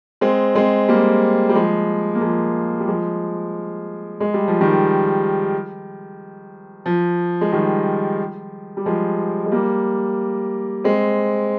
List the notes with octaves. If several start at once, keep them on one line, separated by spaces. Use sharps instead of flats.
G#3 C4
G#3 C4
G3 A#3
G3
F3 G#3
A#3
F3 G#3
G3
F3 G#3
G#3
G3
F3
D#3 G3
F3
G#3
D#3 G3
G3
F3 G#3
G#3
G3 A#3
G#3 C4